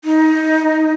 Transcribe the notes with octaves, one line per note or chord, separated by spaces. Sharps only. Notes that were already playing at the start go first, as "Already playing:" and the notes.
D#4